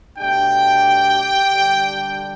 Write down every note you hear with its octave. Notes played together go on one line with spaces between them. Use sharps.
B2 A3 D4 G4 G5
D3 G3 D4